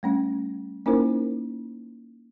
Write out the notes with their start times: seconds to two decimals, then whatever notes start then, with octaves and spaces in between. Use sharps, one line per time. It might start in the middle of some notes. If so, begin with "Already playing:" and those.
0.03 G3 A3 C#4
0.86 A#3 C#4 D#4 E4 A#4 C5